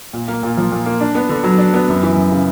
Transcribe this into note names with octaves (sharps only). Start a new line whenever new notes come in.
A#2
A#3
A#2
F3
A#2
A#3
D4
B3
D3
F#3
D4
B3
F#2
E3
F#2
C#3